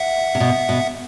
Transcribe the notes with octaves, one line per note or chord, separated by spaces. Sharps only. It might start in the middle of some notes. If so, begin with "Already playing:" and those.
Already playing: E5 F#5
C3
B2
B2